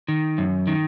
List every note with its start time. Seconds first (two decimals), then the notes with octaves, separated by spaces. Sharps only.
0.08 D#3
0.38 F#2
0.67 D#3